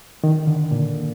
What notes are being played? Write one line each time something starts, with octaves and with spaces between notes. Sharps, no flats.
D#3
D3
A#2